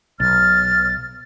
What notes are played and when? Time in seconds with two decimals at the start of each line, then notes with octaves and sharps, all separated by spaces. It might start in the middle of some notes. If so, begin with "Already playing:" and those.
0.20 B1 F6 A6